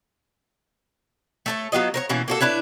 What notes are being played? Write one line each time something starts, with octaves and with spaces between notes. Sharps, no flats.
A3 A4 C#5
F#3 B3 F4 D#5
A#4 C5 C#5
B2 E3 A#3 C#4
A#3 F#4 A4
D4 E4 B4 C#5